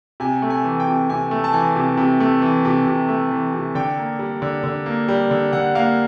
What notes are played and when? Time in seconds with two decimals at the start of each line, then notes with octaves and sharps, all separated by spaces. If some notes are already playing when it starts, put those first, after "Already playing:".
0.20 C3 G#5
0.42 A3
0.50 G#5
0.64 E3
0.80 G5
0.88 C3
1.10 C3 G#5
1.31 A3
1.44 A5
1.53 E3 G#5
1.76 C3
1.97 C3
2.20 A3
2.42 E3
2.65 C3
2.87 C3
3.09 A3
3.31 E3
3.54 C3
3.75 D3 G5
3.98 A#3
4.19 G3
4.42 D3
4.64 D3
4.86 A#3
5.08 G3
5.31 D3
5.53 D3 F#5
5.75 A#3 F5